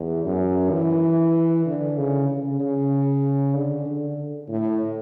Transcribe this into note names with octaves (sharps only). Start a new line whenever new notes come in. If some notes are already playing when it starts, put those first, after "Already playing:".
Already playing: E2
F#2
E3
D3
C#3
C#3
C#3
D3
D3
A2